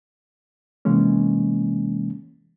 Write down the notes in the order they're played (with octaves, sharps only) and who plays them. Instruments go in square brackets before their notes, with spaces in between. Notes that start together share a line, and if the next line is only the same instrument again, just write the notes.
[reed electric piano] C3 E3 G#3 A#3 C#4